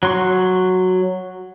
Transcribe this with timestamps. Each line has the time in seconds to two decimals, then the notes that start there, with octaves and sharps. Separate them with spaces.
0.03 F#3 C6 C#6